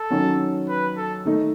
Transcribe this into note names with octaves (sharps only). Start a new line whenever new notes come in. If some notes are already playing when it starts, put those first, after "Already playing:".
Already playing: A4
D#3 F#3 C#4
B4
A4
D#3 A3 D#4